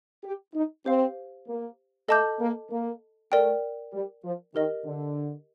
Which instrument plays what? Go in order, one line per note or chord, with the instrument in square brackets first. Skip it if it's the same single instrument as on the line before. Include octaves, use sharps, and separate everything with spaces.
[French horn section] G4
D#4
[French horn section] C4 [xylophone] G4 C5 F5
[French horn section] A#3
[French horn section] A3 [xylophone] A4 D#5 A5 D6 G6
[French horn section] A#3
A#3
[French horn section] A3 [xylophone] A#4 D5 G5
[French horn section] G3
F3
[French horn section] D#3 [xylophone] G4 A#4 D#5
[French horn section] D3